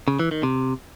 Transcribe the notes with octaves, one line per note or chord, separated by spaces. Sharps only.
C#3
E3
D#3
C3